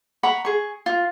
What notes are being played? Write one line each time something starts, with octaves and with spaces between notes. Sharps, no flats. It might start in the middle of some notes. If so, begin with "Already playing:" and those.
F#5 A#5 B5 C#6
G#4 C#6
F4